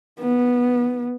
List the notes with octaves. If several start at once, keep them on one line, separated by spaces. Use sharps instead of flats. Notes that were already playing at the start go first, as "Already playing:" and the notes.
B3